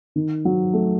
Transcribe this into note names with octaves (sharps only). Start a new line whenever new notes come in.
D#3
F#3
A3